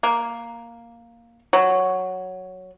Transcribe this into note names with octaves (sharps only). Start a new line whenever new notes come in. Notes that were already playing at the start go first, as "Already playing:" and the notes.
A#3
F#3